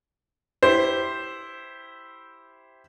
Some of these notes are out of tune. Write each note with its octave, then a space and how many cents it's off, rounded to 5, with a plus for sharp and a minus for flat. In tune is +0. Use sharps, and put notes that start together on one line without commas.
E4 +0 G4 -5 C5 +0